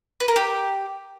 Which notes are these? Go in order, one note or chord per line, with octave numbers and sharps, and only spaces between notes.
B4
A#4
G4